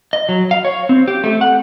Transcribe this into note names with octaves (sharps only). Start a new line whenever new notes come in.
D#5
F#3
F5
C#5
C4
G4
A3
F#5